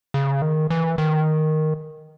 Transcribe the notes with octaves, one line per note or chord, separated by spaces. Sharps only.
C#3
D#3
E3
D#3